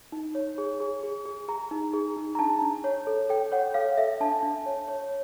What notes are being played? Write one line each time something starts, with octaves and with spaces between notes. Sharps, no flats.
D#4
C#5
G#4
G#4
G#4
G#4
G#4 A#5
D#4
G#4
D#4
A#5
D4 A5
D4
C#5
A4
A4 G5
C#5 F#5
A4 F5
A4 E5
D4 A5
D4
C#5
C#5